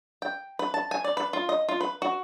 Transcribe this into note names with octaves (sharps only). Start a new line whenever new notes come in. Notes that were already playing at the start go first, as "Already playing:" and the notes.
G5
B4
A5
G#5
D5
B4
F4
D#5
F4
B4
F#4